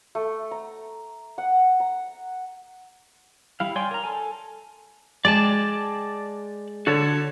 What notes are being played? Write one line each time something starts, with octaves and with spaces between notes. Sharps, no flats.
A3
A#5
F#5
A#5
G3 E4 F5
C#5 D5 G5 G#5 C6
A#4 A#5
A4 G#5
G#3 D5 G5 A5 D6 A6
D3 F#4 A4 C#5